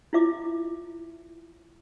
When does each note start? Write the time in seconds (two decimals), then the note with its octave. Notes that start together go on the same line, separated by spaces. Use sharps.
0.13 E4 F4 E5 D6